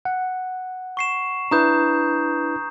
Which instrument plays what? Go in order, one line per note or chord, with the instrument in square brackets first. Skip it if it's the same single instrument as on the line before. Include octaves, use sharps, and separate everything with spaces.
[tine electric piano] F#5
[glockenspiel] C#6 C7 E7
[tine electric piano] D4 E4 B4 [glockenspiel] A#5 D#6 G6